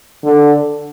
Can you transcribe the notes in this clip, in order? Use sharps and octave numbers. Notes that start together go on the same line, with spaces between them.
D3